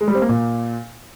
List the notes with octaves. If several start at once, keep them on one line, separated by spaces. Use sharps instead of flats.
G#3
G3
C4
A#3
A#2